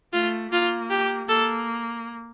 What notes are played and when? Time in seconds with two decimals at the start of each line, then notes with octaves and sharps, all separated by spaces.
0.13 A3 F4
0.52 A#3 F4
0.90 G4
1.29 A#3 A4